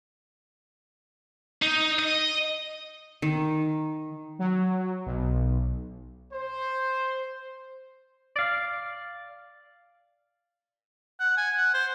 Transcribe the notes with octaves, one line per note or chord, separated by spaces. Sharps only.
D#4
D#5
D#3
F#3
B1
C5
D5 F5
F#5
G#5
F#5
C5